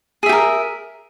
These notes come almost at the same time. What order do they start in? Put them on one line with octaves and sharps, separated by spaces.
G#4 E5 G4 A#4